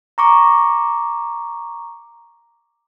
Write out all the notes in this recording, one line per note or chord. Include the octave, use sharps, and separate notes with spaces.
A#5 C#6 D6